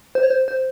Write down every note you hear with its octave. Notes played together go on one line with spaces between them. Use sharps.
C5
C#5
C5
C5